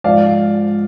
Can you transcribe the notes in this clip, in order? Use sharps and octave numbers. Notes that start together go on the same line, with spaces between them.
G#2 F3 D5 F5